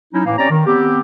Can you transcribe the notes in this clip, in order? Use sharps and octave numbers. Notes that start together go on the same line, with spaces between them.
F#3 C#4 D#4 E4
A2 E3 A#3
C4 C#4 G4 C#5 D5 A#5
D#3
B3 C4 G4